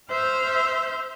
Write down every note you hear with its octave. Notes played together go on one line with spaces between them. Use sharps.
C5 E5 F6 G6